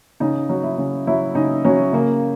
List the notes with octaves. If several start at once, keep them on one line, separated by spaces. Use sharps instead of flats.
C#3 D#4
F#3
E4
C#3
F#3 E4
C#3 D#4
F#3 C#4
C#3 A#3